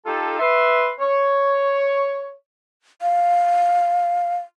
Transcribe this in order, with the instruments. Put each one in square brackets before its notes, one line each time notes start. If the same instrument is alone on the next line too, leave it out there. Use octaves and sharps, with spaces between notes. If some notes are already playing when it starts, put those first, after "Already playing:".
[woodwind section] D#4 F4 G4 A4
B4 E5 C6
C#5
[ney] F5